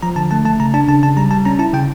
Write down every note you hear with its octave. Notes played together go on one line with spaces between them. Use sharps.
F3 A#5
D3 A5
A3 A5
A3 A5
C#3 A#5
D4 A5
C#3 A5
C#3 A5
G3 A#5
G3 A5
C#4 A#5
E4 A5
C#3 G5